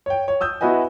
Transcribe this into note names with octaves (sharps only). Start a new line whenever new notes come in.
C#5 G5
C#5
D#6 E6 G6
B3 E4 F#4 B4 D#5 G#5